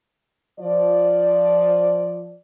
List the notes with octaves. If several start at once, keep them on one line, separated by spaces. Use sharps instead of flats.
F3 D5